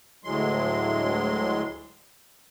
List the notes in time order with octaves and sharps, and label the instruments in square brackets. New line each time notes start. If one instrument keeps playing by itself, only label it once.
[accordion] D2 A2 F#3 G#3 C6